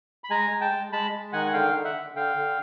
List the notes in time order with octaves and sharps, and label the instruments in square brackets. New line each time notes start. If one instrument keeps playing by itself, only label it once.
[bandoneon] B5
G#3 G#5 A#5
G#3
G5 A5
G#3
G#3 A5 B5
G#3
D#3 F#5 G#5
F#5
D3 F5 G5
D3
E5 F#5
D3
D3 F5 G5
D3